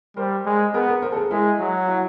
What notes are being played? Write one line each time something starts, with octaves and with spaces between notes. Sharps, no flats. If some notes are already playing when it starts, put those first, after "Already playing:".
G3 A#4 C5
G#3
B3 G#4 A#4
G#4 A#4
A#4 C5
A4
G#4 A#4
G#3 E4
F#3
E4 F#4